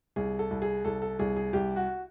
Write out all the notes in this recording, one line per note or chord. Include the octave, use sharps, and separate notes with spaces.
C2 G#4
A4
C2
G#4
C2 A4
A4
C2 G#4
G#4
C2 G4
F#4